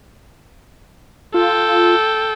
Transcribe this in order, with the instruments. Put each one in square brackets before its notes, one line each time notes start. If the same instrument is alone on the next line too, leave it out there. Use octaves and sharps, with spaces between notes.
[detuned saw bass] F4 [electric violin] A4 G5